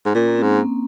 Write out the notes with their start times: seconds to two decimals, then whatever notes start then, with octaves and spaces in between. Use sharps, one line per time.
0.06 G#2
0.15 A#2 C#4
0.28 A#3
0.35 C4
0.43 G#2
0.58 A#3